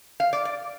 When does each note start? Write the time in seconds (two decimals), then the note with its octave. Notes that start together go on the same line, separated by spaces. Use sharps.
0.20 F5
0.33 D5
0.45 D5